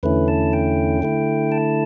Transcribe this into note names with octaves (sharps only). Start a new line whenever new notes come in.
E2 D3 A3 C#4 E4 B4
A5
G5
D3 A3 E4
A5